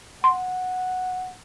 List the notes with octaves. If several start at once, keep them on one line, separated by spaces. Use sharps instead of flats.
F#5 C6